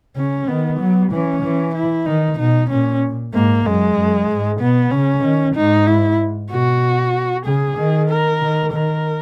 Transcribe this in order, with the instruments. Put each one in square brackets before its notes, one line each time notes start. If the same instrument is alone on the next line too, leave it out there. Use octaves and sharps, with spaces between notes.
[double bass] C#3 [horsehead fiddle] C#4
[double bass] D#3 [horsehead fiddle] B3
[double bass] F#3
[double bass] E3 [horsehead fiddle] C#4
[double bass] E3
[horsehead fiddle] E4
[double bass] D#3 [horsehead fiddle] D#4
[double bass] B2 [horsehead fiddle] D#4
[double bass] A#2 [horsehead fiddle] C#4
[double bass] G#2 [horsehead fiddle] A#3
[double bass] F#2 [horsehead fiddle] G#3
[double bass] F#2
G#2
[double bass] B2 [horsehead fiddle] B3
[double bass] C#3 [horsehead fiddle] C#4
[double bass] D#3
[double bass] G#2 [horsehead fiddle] D#4
[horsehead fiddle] E4
[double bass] B2 [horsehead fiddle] F#4
[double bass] C#3 [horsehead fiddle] G#4
[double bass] D#3
[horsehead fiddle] A#4
[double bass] D#3
[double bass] D#3 [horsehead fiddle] A#4